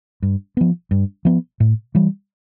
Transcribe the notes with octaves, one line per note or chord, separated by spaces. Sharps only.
G2
F3 B3
G2
F3 B3
A2
E3 G3